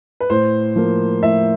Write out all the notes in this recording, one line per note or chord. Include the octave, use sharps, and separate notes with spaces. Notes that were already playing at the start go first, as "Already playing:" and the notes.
B4
A2 C5
F3 A#3
A2 E5